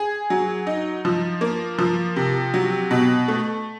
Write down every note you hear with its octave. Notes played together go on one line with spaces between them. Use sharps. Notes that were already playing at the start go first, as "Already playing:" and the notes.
Already playing: G#4
F#3
D#4
F3
A#3
F3
C3
F#3
B2
A3